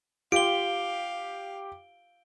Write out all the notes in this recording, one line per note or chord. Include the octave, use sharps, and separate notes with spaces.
F4 G4 F5 D7 G7